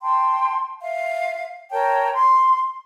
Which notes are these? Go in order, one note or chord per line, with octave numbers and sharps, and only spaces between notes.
G5 A5 C6
E5 F5
A#4 C#5 G5 A5
C6